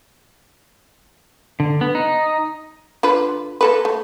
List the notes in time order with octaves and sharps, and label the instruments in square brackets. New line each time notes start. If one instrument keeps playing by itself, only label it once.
[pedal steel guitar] D3
B3
D#4
[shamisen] D3 F4 B4
A#3 A4 B4
A3